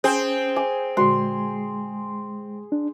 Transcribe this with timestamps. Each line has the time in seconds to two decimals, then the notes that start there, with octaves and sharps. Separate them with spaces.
0.04 C4 C#4 G#4 C5
0.56 G#5 D6
0.97 A#2 D3 G#3 F#4 C6
2.72 D4